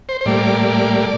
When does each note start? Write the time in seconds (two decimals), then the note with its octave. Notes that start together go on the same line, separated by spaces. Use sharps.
0.09 C5
0.21 C5
0.26 A2 G3 A#3 D5